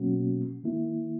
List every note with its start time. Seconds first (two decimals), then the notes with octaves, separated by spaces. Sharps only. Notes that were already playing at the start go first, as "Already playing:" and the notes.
Already playing: B2 F#3 A#3 C#4 F#4
0.63 D#3 A#3 E4